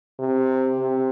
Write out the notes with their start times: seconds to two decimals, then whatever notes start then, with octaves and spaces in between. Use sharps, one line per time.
0.19 C3
0.80 C3